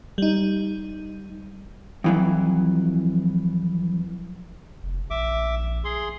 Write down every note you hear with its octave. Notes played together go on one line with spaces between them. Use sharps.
G3 D#4
F2 E3 F#3
F1
A#1 E5 D6
G#4 C6